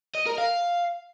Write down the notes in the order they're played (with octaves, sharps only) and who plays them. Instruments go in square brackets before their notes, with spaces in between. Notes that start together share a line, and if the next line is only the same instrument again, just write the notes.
[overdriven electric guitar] D#5
A#4
F5